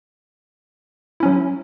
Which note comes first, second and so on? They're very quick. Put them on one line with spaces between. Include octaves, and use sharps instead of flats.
E4 C#4 F#3